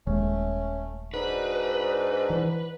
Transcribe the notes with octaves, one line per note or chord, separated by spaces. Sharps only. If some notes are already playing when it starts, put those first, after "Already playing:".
D#1 D#2 G#3 A3 C#4
G#2 D4 D#4 F#4 B4
E3